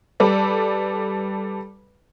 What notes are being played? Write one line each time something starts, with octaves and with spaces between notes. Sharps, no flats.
G3 A4 B4 D5